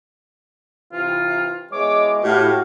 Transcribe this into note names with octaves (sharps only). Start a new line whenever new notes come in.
C3 E3 F4
B2 E3 G#3 C#5 D6
A2 F#4 G4 F5